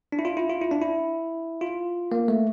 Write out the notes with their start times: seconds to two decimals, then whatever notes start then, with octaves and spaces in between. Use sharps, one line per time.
0.12 D4
0.19 E4
0.25 F4
0.37 E4
0.50 F4
0.61 E4
0.71 D4
0.82 E4
1.61 F4
2.12 A#3
2.28 A3